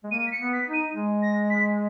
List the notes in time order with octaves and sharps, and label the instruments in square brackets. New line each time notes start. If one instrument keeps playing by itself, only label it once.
[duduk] G#3
[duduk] A#3 [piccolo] D#7
[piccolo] B6
C#7
[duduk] B3
[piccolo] B6
[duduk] D#4
[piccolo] D#7
[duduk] G#3
[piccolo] A#6
B6